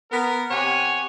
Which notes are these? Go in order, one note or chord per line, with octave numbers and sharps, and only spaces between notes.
B3 A#4
C3 G4 C#5 F#5 G#5